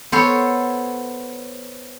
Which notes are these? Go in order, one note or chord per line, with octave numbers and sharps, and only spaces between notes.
B3 A4 C5 C#5